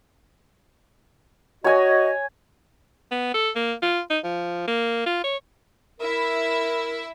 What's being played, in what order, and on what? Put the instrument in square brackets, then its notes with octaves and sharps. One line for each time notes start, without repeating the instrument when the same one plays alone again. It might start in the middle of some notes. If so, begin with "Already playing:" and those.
[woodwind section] F#4 D#5 [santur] C#5 G#5
[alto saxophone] B3
A4
A#3
F4
D#4
F3
A#3
F4
C#5
[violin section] E4 E5 [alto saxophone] A#4